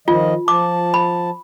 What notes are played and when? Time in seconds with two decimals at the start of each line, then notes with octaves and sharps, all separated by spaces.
0.08 D#3 F3 F4 D#5
0.48 F3 A5 D6
0.94 B5